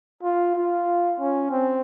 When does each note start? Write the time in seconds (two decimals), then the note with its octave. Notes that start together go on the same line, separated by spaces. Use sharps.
0.23 F4
0.56 F4
1.20 C#4
1.51 C4